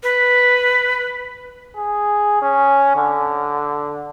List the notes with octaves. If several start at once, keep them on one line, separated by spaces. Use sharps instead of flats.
B4
G#4
C#4
D3